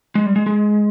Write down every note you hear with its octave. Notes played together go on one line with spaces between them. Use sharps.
G#3
G3
G#3
G#3